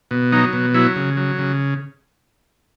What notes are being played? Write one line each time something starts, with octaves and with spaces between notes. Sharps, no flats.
B2
F#3 D#4
B2
F#3 E4
C#3
F#3
C#3